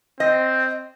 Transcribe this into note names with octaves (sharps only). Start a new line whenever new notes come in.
C4 D#5